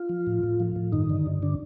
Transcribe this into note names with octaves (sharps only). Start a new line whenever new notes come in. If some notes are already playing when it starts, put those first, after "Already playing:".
Already playing: F4
F3
A2
A2
F3
A2
G2 D#3 D#4
D3
G2
D3 D4